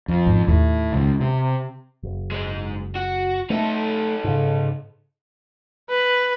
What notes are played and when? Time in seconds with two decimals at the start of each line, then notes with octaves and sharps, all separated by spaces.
0.08 F2
0.26 G#2 C#4
0.48 D#2 A2
0.93 C#2
1.21 C3
2.03 F#1
2.32 G#2 G#3
2.96 F#4
3.50 A3 D#4 A4
4.24 G#2 C#3
5.90 B4